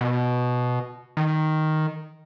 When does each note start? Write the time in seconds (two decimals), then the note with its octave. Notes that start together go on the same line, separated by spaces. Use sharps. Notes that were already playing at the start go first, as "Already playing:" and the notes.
0.01 B2
1.17 D#3